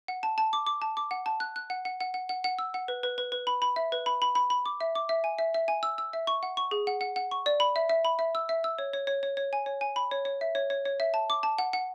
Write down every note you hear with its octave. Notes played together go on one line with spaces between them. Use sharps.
F#5
A5
A5
D6
D6
A5
D6
F#5
A5
F#6
F#6
F#5
F#5
F#5
F#5
F#5
F#5
E6
F#5
B4
B4
B4
B4
B5
B5
E5
B4
B5
B5
B5
B5
D6
E5
D6
E5
G#5
E5
E5
G#5
E6
E6
E5
C#6
F#5
C#6
G#4
F#5
F#5
F#5
C#6
D5
B5
E5
E5
B5
E5
E6
E5
E6
C#5
C#5
C#5
C#5
C#5
G#5
C#5
G#5
B5
C#5
C#5
E5
C#5
C#5
C#5
E5
A5
D6
A5
F#5
F#5